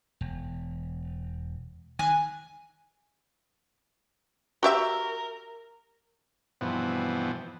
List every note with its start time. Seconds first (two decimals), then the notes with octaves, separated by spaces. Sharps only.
0.21 E1
1.99 D#3 G#5 F#6
4.63 F#4 G4 A#4 E5
6.61 G2 B2 E3 F3 B3 C4